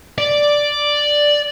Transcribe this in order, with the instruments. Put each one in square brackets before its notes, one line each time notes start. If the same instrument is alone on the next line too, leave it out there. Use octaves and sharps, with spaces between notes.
[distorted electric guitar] D5